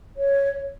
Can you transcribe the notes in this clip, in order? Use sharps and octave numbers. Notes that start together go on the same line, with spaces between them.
C#5